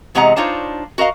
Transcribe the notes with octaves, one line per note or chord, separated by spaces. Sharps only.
E2 C3 G#3 D#5 F#5 A#5
D4 D#4 F4 C5 C#5
F#4 A#4 D#5 F5